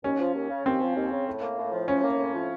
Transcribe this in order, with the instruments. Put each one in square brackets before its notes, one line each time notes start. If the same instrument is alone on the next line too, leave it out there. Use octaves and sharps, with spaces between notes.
[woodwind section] D#2 [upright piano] C#4
[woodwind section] F3
D#2
C#3
[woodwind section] D#2 [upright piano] C4
[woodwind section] F3
D#2
C#3
A2
A#3
A2
F3
[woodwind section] A2 [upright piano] C#4
[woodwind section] A#3
A2
F3